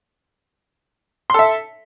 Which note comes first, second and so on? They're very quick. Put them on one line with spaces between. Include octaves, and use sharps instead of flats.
C6 A4 E5